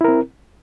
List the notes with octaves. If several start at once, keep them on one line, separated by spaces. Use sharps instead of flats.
C4 E4 A#4